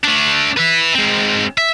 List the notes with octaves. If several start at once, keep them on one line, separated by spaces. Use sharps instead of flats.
A3 D4
B4 E5
G#3 C4
E5